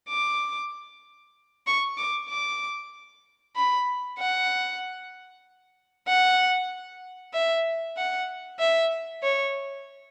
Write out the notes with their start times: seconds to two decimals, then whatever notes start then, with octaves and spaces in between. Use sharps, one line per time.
0.09 D6
1.67 C#6
1.97 D6
2.29 D6
3.56 B5
4.18 F#5
6.07 F#5
7.33 E5
7.97 F#5
8.59 E5
9.23 C#5